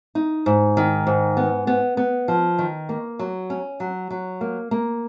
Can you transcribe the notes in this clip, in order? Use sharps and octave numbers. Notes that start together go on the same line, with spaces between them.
D#4
G#2
D#3
G#2
B3
B3
B3
F3
D#3
A#3
F#3
C#4
F#3
F#3
A#3
A#3